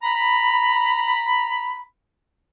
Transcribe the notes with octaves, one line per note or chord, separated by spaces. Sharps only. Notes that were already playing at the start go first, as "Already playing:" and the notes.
A#5 B5